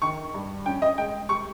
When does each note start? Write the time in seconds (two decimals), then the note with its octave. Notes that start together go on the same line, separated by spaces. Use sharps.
0.02 D#3 C#6
0.34 G2
0.66 C#4 G5
0.82 D#5
0.98 G#3 G5
1.29 G3 C#6